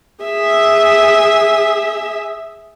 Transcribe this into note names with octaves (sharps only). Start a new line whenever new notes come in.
G#4 E5